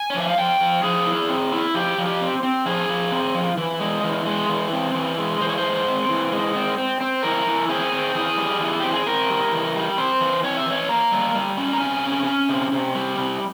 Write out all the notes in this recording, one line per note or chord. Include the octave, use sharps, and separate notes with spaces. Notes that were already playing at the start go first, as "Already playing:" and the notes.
Already playing: G#5
C#5
F3
E5
F5
F3 G5
F3
F3 G#4
E4
C4
E4
F3 G4
F3
G4
C4
C4
F3 G#4
F3
C4
F3
E3
G#3
E3
G#3
E3
C4
E3
G#3
E3 C5
C#5
C5
G#3
C4
E3
G#3
C4
C4
C4
E3 A#4
E3
C4 G#4
C4
E3 G#4
G3
E3
C4 G4
G#4
C4 A#4
G3
E3
G3
C4 C5
E3
C4 C#5
E5
E3 C#5
A#3 A#5
G3
G3
C#4
A#5
C3 G#5
C#4
C#4
C3
C3
G3
C3